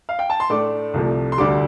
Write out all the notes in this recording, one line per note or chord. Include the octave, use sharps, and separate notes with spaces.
F5
G5
A5
C6
A2 A3 D4 D6
C2 C3 F3 A3
C6
D2 D3 G3 D6